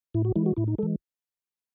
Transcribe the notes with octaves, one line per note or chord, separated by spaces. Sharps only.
A2 E4
F#4
E3 G#3 E4
F#4
A2 E4
D#4
E3 G#3 A4